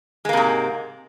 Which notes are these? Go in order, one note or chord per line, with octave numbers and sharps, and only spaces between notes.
G#2 C3 G#3 A#3